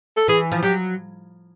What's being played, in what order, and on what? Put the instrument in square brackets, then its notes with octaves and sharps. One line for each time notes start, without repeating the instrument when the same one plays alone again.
[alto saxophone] A4
[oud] E3 [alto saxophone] G#4
[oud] F3
[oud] F#3 [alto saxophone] G4